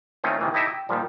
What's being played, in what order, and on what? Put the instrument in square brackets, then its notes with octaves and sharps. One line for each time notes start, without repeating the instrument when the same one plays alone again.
[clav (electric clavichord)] D#3 A3 C4 C#4 F4
C3 D#3 E3
D#4 E4 G4 A4 D#5 E5
G5
A#2 D#3 F3 G3